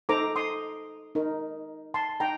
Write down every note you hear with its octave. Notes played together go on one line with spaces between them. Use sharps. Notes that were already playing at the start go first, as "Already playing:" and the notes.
D#4 A4 C5 A#5 D6
C6 D#6
D#4 A#4
A5 C6
D#4 G5 A#5